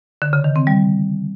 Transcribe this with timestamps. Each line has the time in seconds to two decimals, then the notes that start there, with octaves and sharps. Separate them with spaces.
0.22 D3
0.33 C#3
0.44 D#3
0.56 C4
0.67 G3